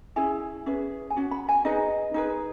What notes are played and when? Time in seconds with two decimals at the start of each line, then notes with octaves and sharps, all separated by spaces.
0.16 C#4 E4 G#4 G#5
0.66 C#4 G#4 B4
1.10 G#5
1.16 C#4 F#4
1.31 B5
1.49 G#5
1.65 D#4 G#4 B4 D#5
2.14 D#4 G#4 B4